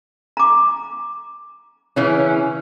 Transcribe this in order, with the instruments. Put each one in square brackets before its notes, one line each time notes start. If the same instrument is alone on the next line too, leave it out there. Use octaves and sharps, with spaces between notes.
[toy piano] A#5 D6
[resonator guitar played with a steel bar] C#3 E3 C#4